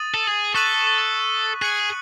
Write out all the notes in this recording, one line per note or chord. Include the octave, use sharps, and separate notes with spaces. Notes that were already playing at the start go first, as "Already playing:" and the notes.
Already playing: D#6 A6 D#7 F#7
A4
G#4
A4 C#6 F#6 B6 D#7 F#7
G#4 F#6 C#7 F#7